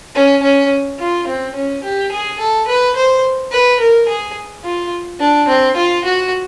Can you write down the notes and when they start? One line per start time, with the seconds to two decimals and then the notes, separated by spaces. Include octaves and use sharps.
0.15 C#4
0.43 C#4
0.99 F4
1.27 C4
1.55 C#4
1.83 G4
2.11 G#4
2.39 A4
2.68 B4
2.96 C5
3.52 B4
3.80 A#4
4.08 G#4
4.64 F4
5.20 D4
5.48 C4
5.76 F4
6.05 F#4